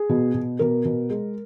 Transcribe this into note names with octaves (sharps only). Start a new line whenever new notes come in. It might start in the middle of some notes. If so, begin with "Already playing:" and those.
Already playing: G#4
B2
B2
B2 A#4
B2
G#3